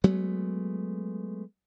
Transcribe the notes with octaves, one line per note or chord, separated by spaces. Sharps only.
F#3 G#3 A3 B3